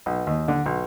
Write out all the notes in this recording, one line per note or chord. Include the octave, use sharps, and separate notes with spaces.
B1
D#2
D3
B1